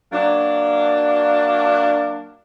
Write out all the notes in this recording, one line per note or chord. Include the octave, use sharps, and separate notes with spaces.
F#3 A#3 D4